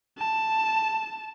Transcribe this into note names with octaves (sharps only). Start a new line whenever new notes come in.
A5